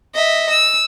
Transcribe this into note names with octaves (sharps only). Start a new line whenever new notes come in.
D#5 E5
E6